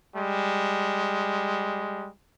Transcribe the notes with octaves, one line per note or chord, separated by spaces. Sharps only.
G3 G#3